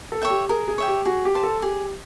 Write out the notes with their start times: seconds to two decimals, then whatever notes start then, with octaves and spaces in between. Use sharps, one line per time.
0.12 A4
0.21 C#5 E5 G5
0.30 G4
0.49 G#4 A#4
0.68 G#4
0.78 C#5 E5 G5
0.88 G4
1.05 F#4 G#4
1.25 G4
1.34 C5 F5 A5
1.43 A4
1.62 G4 G#4